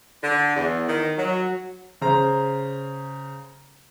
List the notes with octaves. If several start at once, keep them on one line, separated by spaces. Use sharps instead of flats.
D3
E2
D#3
F#3
C#3 C5 A#5